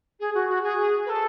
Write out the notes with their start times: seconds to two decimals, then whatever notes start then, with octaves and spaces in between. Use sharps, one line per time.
0.20 G#4
0.34 F#4
0.49 F#4
0.63 G#4
1.05 B4
1.09 A4